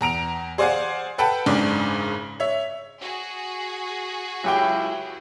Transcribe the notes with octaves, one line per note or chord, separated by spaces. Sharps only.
E2 A#5 D7 F7
G#4 C5 D5 F5 F#5 G#5
A4 B4 F#5 G5 A5 B5
F#1 G#2 C#3 D4 D6
C#5 E5
F#4 G#4
C#2 C#3 F#3 E4 G4 G5